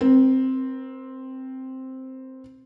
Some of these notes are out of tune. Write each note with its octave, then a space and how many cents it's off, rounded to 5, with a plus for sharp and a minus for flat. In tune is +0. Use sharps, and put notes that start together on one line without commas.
C4 +0 A#4 +40